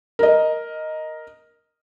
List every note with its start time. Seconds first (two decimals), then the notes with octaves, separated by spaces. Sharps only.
0.19 A#4 D#5